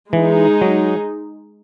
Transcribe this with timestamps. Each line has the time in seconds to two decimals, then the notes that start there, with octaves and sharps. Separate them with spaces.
0.13 E3 G#3 D#4 G#4
0.61 F#3